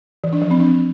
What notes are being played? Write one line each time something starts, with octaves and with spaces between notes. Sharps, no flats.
E3
D4
F3
C4
D4